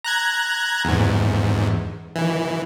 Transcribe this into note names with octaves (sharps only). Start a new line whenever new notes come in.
A#5 F#6 G#6
E2 G#2
E3